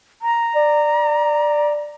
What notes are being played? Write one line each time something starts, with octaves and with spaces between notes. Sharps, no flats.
A#5
D5